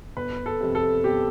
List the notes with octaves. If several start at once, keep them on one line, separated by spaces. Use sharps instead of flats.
G1 B4
A4
F2 C3
A4
G1 G4